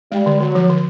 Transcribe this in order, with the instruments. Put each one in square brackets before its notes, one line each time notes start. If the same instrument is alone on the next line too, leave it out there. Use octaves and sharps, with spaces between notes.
[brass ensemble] G3 [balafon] G#3
[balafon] D3
[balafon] D3 [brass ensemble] F#3
[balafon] F3
D3